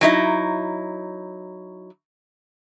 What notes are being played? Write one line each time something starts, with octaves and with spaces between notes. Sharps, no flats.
F#3 D#4 E4